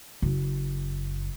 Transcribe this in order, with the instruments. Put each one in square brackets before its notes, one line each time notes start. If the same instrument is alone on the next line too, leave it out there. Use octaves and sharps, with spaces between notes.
[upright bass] F#1